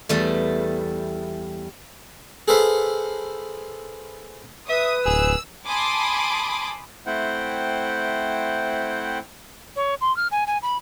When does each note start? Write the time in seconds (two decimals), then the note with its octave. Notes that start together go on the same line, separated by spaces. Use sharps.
0.09 E2 G3 A3
2.48 G#4 A4 B4 C5 E5 F5
4.69 B4 E5 D#6
5.06 D1 G#4 E6
5.67 G#5 A5 B5 C6 D6 D#6
7.06 A3 C4 E4 C5 F#5 G5
9.76 C#5
10.01 C6
10.16 F6
10.31 G#5
10.47 G#5
10.63 B5